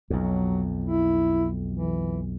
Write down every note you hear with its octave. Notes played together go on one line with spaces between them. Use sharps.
B1 F2 F#3
E4
E3